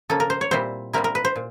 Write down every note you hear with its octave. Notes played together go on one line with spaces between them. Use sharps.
C#3 F3 A#3 A4
A#4
C5
C#5
A#2 G3 C4 E4 C5
A#2 G3 C4 E4 A#4
A#4
B4
C5
A#2